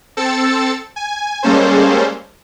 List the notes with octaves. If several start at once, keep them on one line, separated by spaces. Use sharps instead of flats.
C4 A4 E6 A6 C#7
G#5
G3 G#3 A#3 C#4 A4 C5